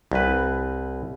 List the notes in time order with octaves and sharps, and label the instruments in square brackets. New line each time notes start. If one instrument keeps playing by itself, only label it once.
[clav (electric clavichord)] C2 B4